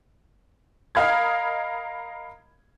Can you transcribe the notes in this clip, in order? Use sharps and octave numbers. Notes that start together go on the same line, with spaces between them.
A#4 D#5 F5 B5 G#6